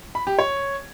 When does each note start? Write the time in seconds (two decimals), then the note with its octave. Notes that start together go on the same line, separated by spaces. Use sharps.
0.15 B5
0.27 G4
0.39 C#5